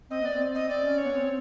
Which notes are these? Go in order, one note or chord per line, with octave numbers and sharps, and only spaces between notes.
C4 D#5
B3 D5
C4
D#5
C4 D5
C#4
C#5
B3
C4